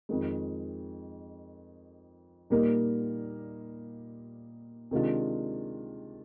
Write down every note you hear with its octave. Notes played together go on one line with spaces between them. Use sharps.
F2 D#3 G#3
A#2 G3 A#3 D#4 A#4
C3 D#3 G#3 D4 F4